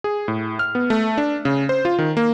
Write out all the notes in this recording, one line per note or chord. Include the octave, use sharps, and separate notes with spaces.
G#4
A2
F6
B3
A3
D4
C#3
C5
F4
D#3
A#3